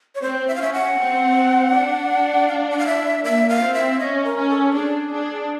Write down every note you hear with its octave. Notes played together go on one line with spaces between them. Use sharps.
C#5
C4 C5
E5
F5
C#4 E5
F#5
C4
D4
F5
F#5
F5
E5
A#3 E5
F5
C4
E5
C#4 D#5
A#4
C#4
A4
A4
D4 G#4
D4